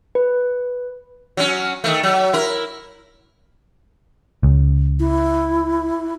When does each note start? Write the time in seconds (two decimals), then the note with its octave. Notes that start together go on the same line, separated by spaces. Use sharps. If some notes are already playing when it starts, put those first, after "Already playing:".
0.15 B4
1.37 F#3 C#4
1.84 D#3 A3
2.03 F#3
2.33 E4 A#4
4.43 C#2
5.00 E4